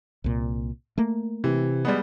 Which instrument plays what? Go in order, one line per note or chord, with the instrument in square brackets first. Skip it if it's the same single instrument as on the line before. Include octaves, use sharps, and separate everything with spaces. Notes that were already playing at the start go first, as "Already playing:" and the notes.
[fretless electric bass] C2 A#2
A3 A#3
[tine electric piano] C3 [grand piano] E3
[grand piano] G3 G#3 B3